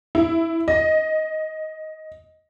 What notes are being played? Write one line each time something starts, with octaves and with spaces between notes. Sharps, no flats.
E4
D#5